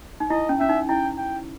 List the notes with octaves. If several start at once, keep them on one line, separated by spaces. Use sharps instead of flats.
D#4
E4 D#5
C#4
C#4 E5
D#4
E4 G5
G5